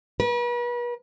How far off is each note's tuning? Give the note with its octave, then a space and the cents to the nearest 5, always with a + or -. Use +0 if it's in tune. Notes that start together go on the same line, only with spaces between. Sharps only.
B4 -40